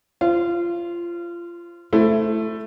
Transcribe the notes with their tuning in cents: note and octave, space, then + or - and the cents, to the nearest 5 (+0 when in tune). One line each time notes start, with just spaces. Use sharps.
F4 -25 C5 +0
A3 +0 E4 +20 C5 +5